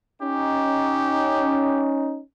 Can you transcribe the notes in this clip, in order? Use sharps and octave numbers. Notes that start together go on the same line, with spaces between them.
C#4 D#4 G4